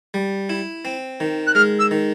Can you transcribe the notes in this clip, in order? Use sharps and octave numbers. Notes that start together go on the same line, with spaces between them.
G3
E4
C4
D#3
F#6
G#3 F6
E6
D#3